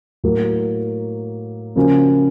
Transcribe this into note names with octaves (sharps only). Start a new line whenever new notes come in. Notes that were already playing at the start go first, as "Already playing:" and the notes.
A2 F#3 A#3
C#3 F3 A#3 C#4 F#4